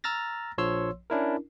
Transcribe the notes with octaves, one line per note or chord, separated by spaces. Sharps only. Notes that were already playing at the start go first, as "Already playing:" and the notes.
A#5 E6 F6 A6 A#6
A#1 F3 C#5 C6 E6
C#4 D4 E4 A#4